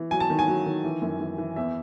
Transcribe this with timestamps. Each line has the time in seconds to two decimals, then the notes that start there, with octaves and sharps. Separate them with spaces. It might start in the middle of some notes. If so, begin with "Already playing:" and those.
Already playing: E3
0.11 F#3 G#5
0.20 A5
0.30 D#3
0.39 G#5
0.48 F#3
0.66 D#3
0.84 E3
1.02 F#2
1.20 E3
1.38 E3
1.56 E2 E5